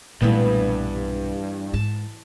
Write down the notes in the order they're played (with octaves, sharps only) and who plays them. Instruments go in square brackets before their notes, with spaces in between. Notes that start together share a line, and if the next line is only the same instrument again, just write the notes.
[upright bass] B1 C4 [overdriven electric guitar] G2 [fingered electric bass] A#2 G#3 A3 [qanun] E3 B3
[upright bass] G#2 [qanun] A5